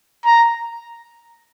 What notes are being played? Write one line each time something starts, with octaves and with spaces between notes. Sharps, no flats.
A#5